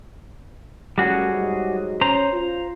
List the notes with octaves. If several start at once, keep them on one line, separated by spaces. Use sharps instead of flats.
G3 A3 C#4 F#4 G#4 A#4
G#2 F#3
C#4 C5 A#5
F4